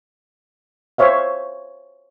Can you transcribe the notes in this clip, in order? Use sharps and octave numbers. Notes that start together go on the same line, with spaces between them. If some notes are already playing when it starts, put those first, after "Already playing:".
C5 C#5 E5 F5